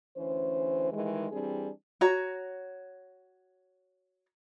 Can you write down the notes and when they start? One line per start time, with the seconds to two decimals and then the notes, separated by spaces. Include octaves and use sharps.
0.17 D2 E3 C#4 C5
0.92 D#3 E3 G3 G#3
1.32 E3 G3 C4 D4 G#4
2.01 F#4 C#5 A#5